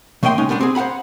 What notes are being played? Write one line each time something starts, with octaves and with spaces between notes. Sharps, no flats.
C#3 A3 A#3 D#5 G5 C6
C#3 G#3 C#4 D#4
G3 A3 B3 C4 D4
C4 G#4
C5 F5 F#5 A#5 B5